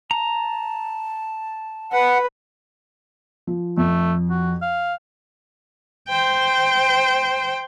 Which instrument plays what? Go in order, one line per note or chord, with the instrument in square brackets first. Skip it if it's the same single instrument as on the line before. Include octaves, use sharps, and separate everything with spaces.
[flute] A5 [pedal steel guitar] A#5
[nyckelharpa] B4 [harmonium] F#5
[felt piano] F3
[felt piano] F2 [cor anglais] A3
[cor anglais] F#4
F5
[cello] C5 G5